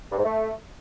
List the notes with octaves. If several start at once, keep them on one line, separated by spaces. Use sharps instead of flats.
G2
G#2
A3